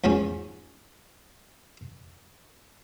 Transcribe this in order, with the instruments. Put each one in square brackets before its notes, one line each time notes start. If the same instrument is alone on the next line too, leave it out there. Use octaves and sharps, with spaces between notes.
[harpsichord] E2 G#2 F3 C#4